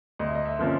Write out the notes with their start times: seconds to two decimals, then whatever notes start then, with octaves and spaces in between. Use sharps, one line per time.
0.19 D2 D#5
0.27 E5
0.35 D#5
0.45 E5
0.59 D3 F3 A#3 C#4